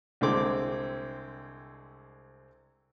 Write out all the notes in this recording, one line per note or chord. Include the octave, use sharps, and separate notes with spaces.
C2 D3 G#3 C4 D6